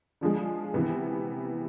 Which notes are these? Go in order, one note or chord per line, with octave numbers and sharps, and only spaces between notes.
D3 F3 G#3
C3 E3 B3